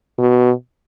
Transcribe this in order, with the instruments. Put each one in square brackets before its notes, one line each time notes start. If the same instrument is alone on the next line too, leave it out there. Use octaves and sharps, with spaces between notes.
[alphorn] B2